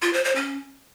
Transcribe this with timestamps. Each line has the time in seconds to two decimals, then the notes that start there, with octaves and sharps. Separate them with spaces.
0.02 F4
0.13 C5
0.24 C5
0.35 C#4